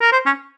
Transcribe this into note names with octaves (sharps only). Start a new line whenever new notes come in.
A#4
C5
C#4